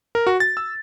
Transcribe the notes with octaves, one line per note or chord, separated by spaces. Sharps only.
A#4
F#4
A6
E6